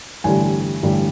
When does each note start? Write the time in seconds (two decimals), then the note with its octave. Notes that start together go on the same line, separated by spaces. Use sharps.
0.24 A1 G2 D3 G3 G#5
0.83 A1 G2 D3 G3